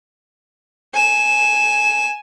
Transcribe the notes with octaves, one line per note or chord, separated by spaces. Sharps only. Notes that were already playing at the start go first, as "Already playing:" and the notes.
G#5 E7